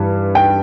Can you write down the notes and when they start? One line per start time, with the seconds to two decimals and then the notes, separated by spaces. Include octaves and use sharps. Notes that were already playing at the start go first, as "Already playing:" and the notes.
Already playing: G2 E3 G3
0.35 G5